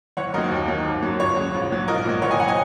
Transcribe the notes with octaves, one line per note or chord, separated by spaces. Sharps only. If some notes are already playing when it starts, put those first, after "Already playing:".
F#1 C#5 F#5
F#2 D#3 F#3 A#4 D#5
D#2
D#3 F#3
G#1
F#2 F#3
C#2 C#5
C#3 F#3
A#1
G#2 F#3
A#1 A#4 D#5
A#2 F#3
F#1 C#5 F#5
D#5 G#5
F#5 A#5
F#3
D#5 G#5